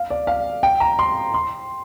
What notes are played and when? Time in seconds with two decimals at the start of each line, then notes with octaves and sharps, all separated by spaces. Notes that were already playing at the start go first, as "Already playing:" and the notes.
Already playing: F5
0.10 D5
0.27 F5
0.63 G5
0.80 A#5
0.99 C6
1.34 C6